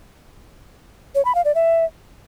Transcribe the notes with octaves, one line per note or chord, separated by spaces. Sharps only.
C#5
B5
F5
D5
E5